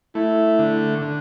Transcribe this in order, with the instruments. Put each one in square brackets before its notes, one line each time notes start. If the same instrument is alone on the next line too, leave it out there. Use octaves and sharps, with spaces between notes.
[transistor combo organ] A3 [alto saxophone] E4
[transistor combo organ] D3
D3